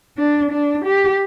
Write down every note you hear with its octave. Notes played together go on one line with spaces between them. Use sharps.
D4
D4
G4